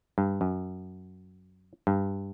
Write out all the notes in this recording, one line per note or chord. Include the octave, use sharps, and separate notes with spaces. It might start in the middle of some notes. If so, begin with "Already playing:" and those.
G2
F#2
G2